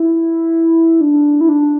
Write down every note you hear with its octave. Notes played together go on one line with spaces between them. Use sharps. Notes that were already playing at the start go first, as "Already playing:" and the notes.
Already playing: E4
D4
E4
D4